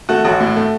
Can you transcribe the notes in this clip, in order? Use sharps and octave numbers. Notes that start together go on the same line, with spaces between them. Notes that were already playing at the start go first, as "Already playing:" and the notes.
A3 F#4
A1 F#4
A2
A3